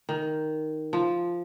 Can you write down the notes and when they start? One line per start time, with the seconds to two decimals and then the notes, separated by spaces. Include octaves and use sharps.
0.09 D#3
0.93 F3